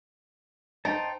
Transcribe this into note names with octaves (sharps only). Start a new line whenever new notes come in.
D#4 C5 G5 A5